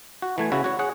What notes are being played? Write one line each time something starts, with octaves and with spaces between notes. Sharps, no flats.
F#4
E3 A3 G#5
C#3 E4 F#4
F#4 C#5
G#4 C#5 F#5